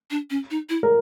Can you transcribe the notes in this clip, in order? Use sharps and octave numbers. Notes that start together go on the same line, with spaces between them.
D4
C#4
D#4
E4
A#4